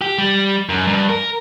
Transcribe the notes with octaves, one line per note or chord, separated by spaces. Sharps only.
G4
G3
F#2
G2
A#4